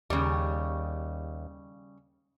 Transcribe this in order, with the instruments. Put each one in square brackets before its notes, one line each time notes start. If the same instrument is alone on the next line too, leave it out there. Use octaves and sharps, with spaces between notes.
[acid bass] D#2 [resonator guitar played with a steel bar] C#3 G3